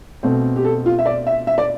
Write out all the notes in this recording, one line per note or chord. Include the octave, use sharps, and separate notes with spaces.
B2 A3 C4
G4
A4
F4
E5
D5
E5
E5
D5